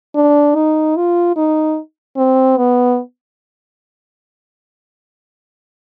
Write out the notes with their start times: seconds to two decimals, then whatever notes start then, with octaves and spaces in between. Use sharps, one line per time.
0.15 D4
0.55 D#4
0.96 F4
1.36 D#4
2.17 C4
2.57 B3